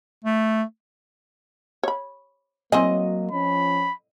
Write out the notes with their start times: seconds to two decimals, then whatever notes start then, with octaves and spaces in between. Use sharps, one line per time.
0.24 A3
1.83 C#5 B5
2.72 F#3 A#3 C4 E4 D#5 G#5
3.31 F3 C#4 B5